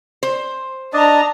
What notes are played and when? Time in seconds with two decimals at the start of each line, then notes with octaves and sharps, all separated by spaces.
0.23 C5
0.93 D4 D5 D#5 A5 A#5